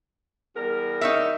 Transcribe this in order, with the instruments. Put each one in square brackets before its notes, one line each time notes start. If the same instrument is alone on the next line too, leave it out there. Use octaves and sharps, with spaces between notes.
[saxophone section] E2 G3 A#4
[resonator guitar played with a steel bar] D#4 C#5 E5